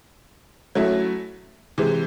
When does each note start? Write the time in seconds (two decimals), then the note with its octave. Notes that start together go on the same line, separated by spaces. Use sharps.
0.75 F#3 A3 C#4 E4
1.78 C3 E3 G#3